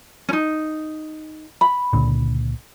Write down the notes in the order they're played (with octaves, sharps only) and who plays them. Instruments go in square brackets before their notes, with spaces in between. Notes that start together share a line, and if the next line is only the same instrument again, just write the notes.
[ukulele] C#4 D#4
B5
[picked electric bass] C#2 A#2 D3